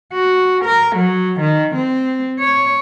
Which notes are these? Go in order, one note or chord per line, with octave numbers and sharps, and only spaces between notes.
F#4
A#4
F#3
D#3
C4
C#5